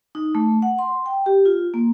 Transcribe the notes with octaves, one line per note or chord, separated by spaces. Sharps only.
D#4
A3
F#5
C6
G5
G4
F4
A#3